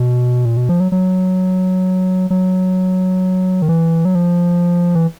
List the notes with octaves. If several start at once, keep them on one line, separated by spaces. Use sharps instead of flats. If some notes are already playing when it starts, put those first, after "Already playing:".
Already playing: B2
A#2
B2
F3
F#3
F#3
F#3
D#3
E3
F#3
F3
E3